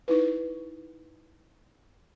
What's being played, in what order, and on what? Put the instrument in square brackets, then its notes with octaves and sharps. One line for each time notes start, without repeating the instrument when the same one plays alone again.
[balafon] D#4 E4 B4